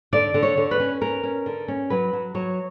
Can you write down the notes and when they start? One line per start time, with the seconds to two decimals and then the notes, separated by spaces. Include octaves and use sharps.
0.13 D3 D5
0.34 D3
0.43 C#5
0.57 D3
0.71 B4
0.80 C#4
1.01 C#4 A#4
1.23 C#4
1.46 D3
1.68 C#4
1.90 F#3 B4
2.13 F#3
2.35 F#3 C#5